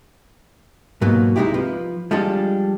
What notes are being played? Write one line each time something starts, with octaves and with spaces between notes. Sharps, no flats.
G#2 B2 F#3 A#3 B3
C2 C3 G#3 D#4 E4 G4
F3 B4
F3 G3 G#3 D4 A4